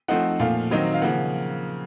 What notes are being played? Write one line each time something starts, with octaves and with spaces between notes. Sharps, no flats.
F3 A3 C4 D#4 F#5
A#2 F3 A3 F5
D#3 F#3 C4 D#4
F5
C#3 F3 A#3 F#5